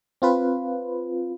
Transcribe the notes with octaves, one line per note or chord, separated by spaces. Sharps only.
C4 F4 B4